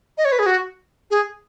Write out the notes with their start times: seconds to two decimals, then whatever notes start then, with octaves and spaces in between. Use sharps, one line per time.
0.18 D#5
0.25 C#5
0.32 B4
0.39 G#4
0.46 F#4
1.11 G#4